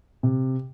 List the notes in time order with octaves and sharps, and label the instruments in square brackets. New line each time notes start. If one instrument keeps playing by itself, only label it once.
[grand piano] C3